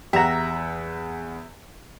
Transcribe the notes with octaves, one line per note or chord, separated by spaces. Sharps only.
E2 G4 E5 F#5 A#5